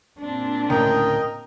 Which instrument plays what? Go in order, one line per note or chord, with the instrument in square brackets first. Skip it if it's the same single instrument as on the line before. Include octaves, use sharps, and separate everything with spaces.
[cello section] A#2 C4 D4
[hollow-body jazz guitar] D2 A2 C#3 [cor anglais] A#4 [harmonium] D#5 G5